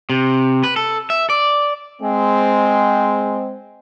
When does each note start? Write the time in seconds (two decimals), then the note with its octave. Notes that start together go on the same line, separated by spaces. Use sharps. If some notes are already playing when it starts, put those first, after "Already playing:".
0.10 C3
0.64 B4
0.76 A4
1.10 E5
1.30 D5
2.02 G#3 C4